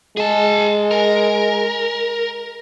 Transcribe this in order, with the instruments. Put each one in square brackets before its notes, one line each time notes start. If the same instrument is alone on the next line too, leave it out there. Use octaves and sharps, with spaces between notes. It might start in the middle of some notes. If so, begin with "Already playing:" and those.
[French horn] G#3 [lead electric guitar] G#4 A5
[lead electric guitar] A#4